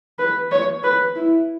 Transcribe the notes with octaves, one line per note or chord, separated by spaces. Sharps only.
B4
C#5
B4
E4